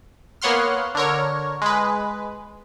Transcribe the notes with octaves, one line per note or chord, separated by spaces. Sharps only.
A#3 B3 C#5 F#5 C6 F6
D3 A#4 C#5
G#3 B4